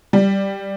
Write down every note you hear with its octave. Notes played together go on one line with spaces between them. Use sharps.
G3